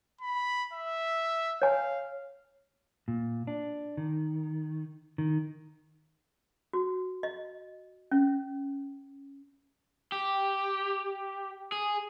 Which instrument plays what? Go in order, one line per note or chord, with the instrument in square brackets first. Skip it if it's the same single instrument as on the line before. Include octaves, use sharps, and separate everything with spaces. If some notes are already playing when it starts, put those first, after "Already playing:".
[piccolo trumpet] B5
E5
[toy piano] C#5 G#5 [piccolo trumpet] F5
[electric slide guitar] A#2
D4
D#3
D#3
[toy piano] F#4
D#5
C#4
[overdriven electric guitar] G4
G#4